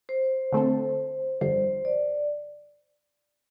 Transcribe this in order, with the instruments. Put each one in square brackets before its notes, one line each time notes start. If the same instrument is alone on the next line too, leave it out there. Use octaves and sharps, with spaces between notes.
[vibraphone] C5
[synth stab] D3 A3 C4 A4
[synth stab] G1 F2 D3 G3 [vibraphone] C5
[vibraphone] D5